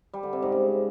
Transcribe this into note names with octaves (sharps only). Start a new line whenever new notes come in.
G3
D3
C3
G#2
C#3